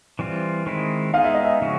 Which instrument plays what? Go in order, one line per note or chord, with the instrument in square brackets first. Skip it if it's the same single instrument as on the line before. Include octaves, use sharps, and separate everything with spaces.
[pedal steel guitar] E3 G3 C4 F4
D#3 G#3 C4 E4
[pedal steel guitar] G#3 B3 D#4 G#4 [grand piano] F5
[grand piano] E5
D#5
E5
[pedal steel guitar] C#3 F3 G#3 C#4 F#4